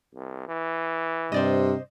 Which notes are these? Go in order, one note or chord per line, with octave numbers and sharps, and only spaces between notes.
C2
E3
G2 C3 C5 D5 D#5